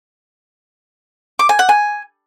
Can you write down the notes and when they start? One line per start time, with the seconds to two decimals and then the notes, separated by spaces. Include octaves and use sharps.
1.39 D6
1.49 G#5
1.59 F#5
1.69 G#5